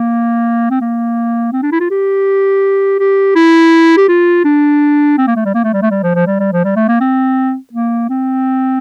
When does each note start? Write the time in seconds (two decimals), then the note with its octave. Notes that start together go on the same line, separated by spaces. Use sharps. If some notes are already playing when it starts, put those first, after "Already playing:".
Already playing: A#3
0.70 C4
0.81 A#3
1.52 C4
1.62 D4
1.72 E4
1.80 F4
1.90 G4
2.99 G4
3.35 E4
3.97 G4
4.08 F4
4.44 D4
5.18 C4
5.27 A#3
5.36 A3
5.45 G3
5.54 A#3
5.64 A3
5.73 G3
5.82 A3
5.91 G3
6.03 F3
6.15 F3
6.27 G3
6.40 G3
6.52 F3
6.64 G3
6.76 A3
6.88 A#3
7.00 C4
7.73 A#3
8.10 C4